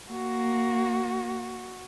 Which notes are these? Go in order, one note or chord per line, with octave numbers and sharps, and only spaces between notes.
A#3 F#4